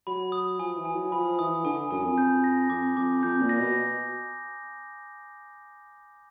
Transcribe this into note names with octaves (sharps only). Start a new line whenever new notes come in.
F#3 B5
D#6
F3 G#5
E3
G#5
F#3
F3 B5
E3 D#6
D3 G#5
F#2 G#5
F2
G6
A#6
F2 D6
F2 D6
F2 G6
A#2
A#6
B2